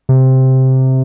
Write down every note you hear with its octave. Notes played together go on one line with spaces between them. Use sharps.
C3